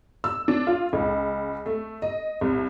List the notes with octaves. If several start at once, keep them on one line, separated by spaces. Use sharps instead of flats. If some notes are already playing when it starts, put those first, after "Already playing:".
E6
D4
F4
C#2
A3
D#5
C2